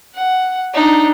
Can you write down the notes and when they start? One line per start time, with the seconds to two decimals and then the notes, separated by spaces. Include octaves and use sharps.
0.14 F#5
0.73 D4 D#4